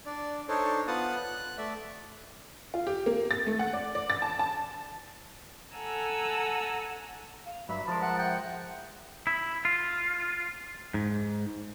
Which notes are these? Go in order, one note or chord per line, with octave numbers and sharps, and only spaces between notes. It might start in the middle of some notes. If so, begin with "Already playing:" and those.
D4 D5
D4 D#4 A4 C5 C#5
B3 F4 F#5 A5 D#6
F#6
A3 D5 E5
F4
G4
A#3
A6
A3
F#5
D5
D5
A6
A5
A5
A4 F#5 G#5 A#5 E6
F5
G2 F#3 E5 B5
F3 G#3 A#4 A5 C6
E5 F#5
F#5 G5
E4
F4
G#2